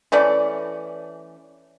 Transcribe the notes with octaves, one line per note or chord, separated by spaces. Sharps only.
E3 A3 C#4 D5